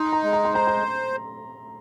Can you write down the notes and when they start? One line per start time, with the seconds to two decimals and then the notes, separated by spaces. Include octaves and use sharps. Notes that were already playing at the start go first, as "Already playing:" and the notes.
Already playing: D#4 C6
0.13 A#5
0.23 G#3
0.33 A#5
0.45 C6
0.53 C5 A#5
0.67 C6